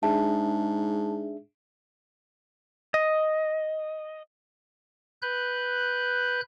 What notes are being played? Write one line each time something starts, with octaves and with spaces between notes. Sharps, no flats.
G#2 D4 G#4 E5 A5
D#5
B4 F#6 G6